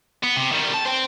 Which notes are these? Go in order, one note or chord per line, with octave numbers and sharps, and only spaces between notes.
B3
C3
D#3 G3
A5
C5 G5